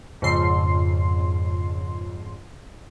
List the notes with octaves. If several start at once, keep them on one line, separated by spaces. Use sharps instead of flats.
F2 G#2 C#3 C6 C7